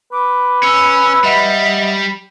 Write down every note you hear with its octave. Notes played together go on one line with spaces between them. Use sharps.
B4 D6
C#4 E6
G3 D#5 E5 F#5